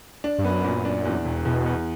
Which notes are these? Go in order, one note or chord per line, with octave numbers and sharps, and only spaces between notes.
D4
G2
F#2 B3
A#2
D4
E2
E1
E2 B2
E2